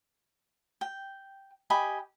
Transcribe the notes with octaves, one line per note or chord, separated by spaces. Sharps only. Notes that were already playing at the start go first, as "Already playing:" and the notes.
G5
G4 D#5 G#5 B5